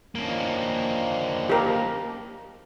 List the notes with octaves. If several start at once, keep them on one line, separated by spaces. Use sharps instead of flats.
D#3 F3 A#3 C#4 D4
G4 A#4